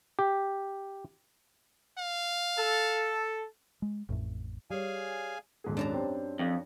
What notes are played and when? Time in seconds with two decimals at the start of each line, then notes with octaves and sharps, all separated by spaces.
0.19 G4
1.98 F5
2.58 A4
3.82 G#3
4.09 A1 F2 A2
4.70 G3 G#4 C#5 F5 G#5
5.64 D#1 G#2 G#4
5.77 F#2 D4 A5 A#5
5.94 C4 G4 C5
6.39 F2